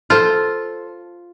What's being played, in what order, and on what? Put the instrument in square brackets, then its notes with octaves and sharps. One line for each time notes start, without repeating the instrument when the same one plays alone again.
[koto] F4 [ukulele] A4 C5